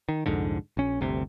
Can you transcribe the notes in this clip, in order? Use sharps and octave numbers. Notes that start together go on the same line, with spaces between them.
D#3
C2 F2 G#2 D3
A#1 C#4
G1 D2 C3